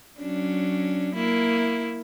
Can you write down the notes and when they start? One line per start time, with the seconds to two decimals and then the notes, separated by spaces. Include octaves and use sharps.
0.19 F#3 C#4 D4
1.15 A#3 E4